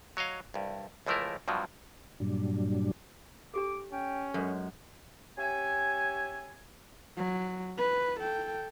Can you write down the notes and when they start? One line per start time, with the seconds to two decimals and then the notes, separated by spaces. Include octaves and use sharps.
0.17 F#3 C#5 D#5 F5
0.54 C2 G2
1.06 C#2 E3 F3 A3 E4 A#4
1.48 G2 B2 F3 F#3
2.20 G2 A#2 F#3 G3 D4
3.54 D4 G4 A4 D6
3.92 C#4 G5
4.34 F#2 G#3 A4 A#4 C#5
5.38 C#4 G4 E5 G#5
7.17 F#3
7.78 B4
8.20 A4 G5